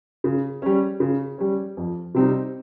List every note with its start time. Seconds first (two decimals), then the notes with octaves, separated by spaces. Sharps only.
0.24 C#3
0.62 G3 C#4
1.00 C#3
1.38 G3 C#4
1.77 F2
2.14 C3 G3 C4 D#4